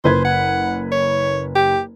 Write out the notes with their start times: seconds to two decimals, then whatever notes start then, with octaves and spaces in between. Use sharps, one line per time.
0.04 F#1 B4 C5 G#6
0.25 F#5
0.92 C#5
1.55 G4